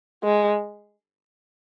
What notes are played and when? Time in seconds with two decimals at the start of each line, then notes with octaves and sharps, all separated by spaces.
0.23 G#3